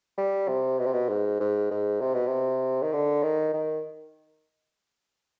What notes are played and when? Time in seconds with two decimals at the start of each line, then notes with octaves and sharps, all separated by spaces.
0.18 G3
0.48 C3
0.79 B2
0.86 C3
0.93 B2
1.09 G#2
1.40 G#2
1.71 G#2
2.01 C3
2.14 B2
2.27 C3
2.82 D#3
2.93 D3
3.23 D#3
3.54 D#3